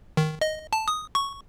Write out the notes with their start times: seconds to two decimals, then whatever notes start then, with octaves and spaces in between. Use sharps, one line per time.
0.17 D#3
0.41 D#5
0.73 A5
0.88 D#6
1.15 C#6